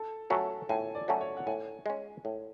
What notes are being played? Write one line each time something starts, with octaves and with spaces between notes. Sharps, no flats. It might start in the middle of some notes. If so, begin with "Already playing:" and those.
Already playing: A4
F#3 A3 C#4 F#4 A4
A2 G#5
D5
F#3 A3 C#4 F#4
C#5
F#5
A2 G#5
G#3 C#4
A2